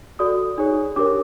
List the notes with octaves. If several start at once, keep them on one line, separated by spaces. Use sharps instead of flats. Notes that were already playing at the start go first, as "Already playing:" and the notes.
F#4 A4 D5 D#6
D#4 G#4 C#5
D4 G4 A#4 C#5 D6